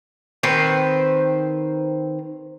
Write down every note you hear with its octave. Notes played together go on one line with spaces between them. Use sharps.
D#3 C4 B4 C5